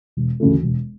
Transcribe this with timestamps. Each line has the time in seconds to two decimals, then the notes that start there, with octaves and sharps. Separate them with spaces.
0.17 E1
0.40 D2 C#3 E3 A3
0.63 E1